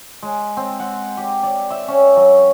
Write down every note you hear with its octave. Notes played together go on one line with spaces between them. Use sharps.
G#3
C4
F#5
G4
D5
E5
C#4
F#3